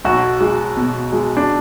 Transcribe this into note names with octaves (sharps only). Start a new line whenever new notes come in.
B1 F#4
G#3
B2
G#3
D4